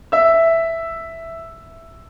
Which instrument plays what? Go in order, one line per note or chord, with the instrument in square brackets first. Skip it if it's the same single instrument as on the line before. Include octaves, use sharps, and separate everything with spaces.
[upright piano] E5 E6